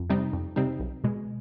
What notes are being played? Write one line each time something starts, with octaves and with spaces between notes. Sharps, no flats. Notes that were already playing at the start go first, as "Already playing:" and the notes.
Already playing: F2
C3 G3 C4 D#4
F2
C3 G3 C4 D#4
B1
B2 G#3